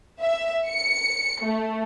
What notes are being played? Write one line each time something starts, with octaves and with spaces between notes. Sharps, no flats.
E5
C#7
A3